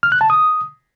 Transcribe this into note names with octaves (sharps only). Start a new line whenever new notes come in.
F6
F#6
A5
D#6